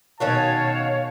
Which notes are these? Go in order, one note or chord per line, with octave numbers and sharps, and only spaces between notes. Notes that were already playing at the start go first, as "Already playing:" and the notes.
B2 D#3 C#4 F#4 C#5 F5 A5